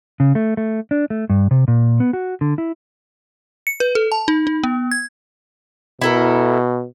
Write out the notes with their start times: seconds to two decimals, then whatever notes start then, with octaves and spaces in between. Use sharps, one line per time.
0.20 C#3
0.35 A3
0.57 A3
0.91 D4
1.10 A3
1.30 G2
1.51 C3
1.68 A#2
2.00 B3
2.13 F#4
2.41 D3
2.58 E4
3.67 C#7
3.80 B4
3.95 A4
4.12 A5
4.28 D#4
4.47 D#4
4.64 B3
4.91 G#6
6.01 B2 E4 A4 A#4